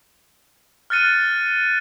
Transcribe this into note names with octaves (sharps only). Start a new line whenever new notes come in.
F6 F#6 A6 C#7 D#7